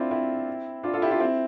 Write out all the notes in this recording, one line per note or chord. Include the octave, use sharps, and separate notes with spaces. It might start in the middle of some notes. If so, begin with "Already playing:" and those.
Already playing: C4 D4 E4 F4
C4 E4
D4 F4
F4 A4
E4 G4
D4 F4
C4 E4